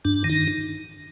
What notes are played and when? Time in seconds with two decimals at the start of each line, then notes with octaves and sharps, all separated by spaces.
0.05 G2 D4
0.24 D#3
0.30 D#4